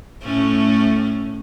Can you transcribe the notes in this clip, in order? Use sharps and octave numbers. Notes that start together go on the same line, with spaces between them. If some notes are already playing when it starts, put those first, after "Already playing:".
A2 A3 C#4